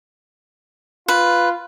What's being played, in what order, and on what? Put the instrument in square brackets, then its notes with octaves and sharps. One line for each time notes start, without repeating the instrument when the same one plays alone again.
[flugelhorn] F4 [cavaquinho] B4